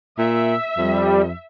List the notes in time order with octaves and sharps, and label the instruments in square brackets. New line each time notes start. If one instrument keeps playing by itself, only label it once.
[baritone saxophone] A#2 [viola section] E5
[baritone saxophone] F2 [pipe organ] G3